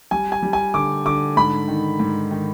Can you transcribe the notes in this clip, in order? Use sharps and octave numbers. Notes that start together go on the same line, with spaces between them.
G3 G#5
G#5
G3
G#5
D3 D6
D3 D6
G#2 B5
D#3
G#2
D#3